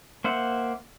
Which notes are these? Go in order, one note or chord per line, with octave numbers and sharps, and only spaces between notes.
A#3 C5 E5 F#5